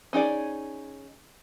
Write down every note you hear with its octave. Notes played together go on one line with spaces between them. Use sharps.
C#4 D#4 G#4 D5